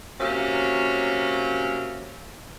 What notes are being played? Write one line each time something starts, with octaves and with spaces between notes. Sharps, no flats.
C3 F#3 A#3 C#4